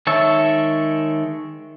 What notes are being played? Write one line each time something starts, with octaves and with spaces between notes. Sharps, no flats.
D#3 G#3 C#5 E5 A5